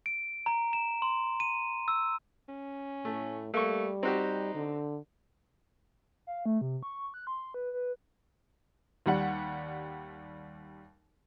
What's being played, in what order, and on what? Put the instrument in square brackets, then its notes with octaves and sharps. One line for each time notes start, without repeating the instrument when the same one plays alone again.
[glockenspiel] D7
A#5
E7
C6
D#7
E6
[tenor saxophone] C#4
[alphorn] A2 [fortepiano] A3
[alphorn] G3 [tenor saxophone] A3 [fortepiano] A#3 C#6
[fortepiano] C4 F#4 G4 [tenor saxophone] D#4
[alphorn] D3
[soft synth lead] F5
A3
C3
C#6
F#6
C6
B4
B4
[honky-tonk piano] D#2 G3 F#5